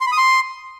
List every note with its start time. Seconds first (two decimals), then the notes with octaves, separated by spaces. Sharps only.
0.01 C6
0.06 B5
0.12 D#6
0.17 C6